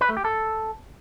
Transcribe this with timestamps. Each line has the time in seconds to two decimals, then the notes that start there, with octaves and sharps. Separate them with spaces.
0.01 B4
0.09 A3
0.17 G4
0.25 A4